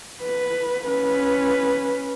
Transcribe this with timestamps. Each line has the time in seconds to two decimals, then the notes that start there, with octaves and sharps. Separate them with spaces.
0.23 B4
0.88 C#4 B4